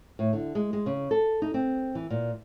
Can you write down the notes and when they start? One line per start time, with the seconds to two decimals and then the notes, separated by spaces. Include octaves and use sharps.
0.19 A2
0.33 D3
0.55 G#3
0.73 G#3
0.86 C#3
1.11 A4
1.42 D#4
1.54 C4
1.95 E3
2.10 A#2